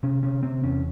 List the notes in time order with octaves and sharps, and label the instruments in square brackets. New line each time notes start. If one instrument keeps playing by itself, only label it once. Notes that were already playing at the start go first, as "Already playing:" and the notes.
[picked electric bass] C3 C#4
C3 C#4
C3 C4
E2 C#4